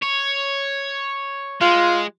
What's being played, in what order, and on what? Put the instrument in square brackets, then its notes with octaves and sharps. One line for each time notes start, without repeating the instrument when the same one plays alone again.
[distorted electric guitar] C#5
[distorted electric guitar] G#3 [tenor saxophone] F4